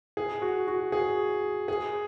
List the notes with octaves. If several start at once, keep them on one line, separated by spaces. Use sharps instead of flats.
G#4
F#4
F#4
G#4
G#4